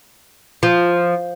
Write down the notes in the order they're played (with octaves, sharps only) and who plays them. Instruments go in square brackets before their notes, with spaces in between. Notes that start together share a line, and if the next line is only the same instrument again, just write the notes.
[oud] F3